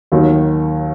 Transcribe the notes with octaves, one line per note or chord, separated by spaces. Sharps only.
D#2 D#3 F#3